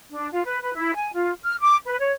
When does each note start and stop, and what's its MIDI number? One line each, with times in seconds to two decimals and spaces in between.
0.12 0.30 62
0.33 0.42 65
0.46 0.59 71
0.63 0.74 71
0.74 0.93 64
0.94 1.09 80
1.13 1.33 65
1.43 1.54 89
1.60 1.76 86
1.86 1.95 71
1.99 2.12 73